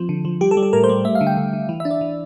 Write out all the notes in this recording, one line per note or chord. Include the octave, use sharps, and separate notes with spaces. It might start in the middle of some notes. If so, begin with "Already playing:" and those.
Already playing: F3 C4
D3
F3
G3 G4
A4
G3
A4
A2 A#4
C5
G3
A3 E5
F5
D3
G5
D3
D3
E3
D4 E5
D5
E3